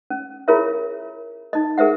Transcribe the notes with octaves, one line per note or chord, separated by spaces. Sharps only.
C#4
E4 F4 G#4 A#4 C#5 E5
D#4 D#5
G#4 A#4 C5 E5 F#5